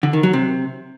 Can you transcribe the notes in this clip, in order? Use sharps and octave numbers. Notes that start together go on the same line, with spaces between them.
D3
D#3
F#3
C3